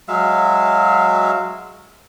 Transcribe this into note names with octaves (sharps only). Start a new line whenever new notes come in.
F#3 G#3 E5 F5